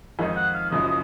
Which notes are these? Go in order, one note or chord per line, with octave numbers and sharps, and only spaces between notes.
F2 D#3 G#3 D#4
F#5
F5
F#1 F#2 C#3 F3 D#5
D#5